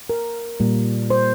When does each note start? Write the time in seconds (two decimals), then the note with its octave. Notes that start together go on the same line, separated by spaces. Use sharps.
0.10 A#4
0.60 A#2 G3 A#3
1.10 C5